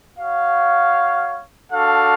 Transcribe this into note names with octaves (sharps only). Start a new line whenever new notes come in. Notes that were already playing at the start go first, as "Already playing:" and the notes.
F#4 C#5 F5
D4 F#4 A4 F5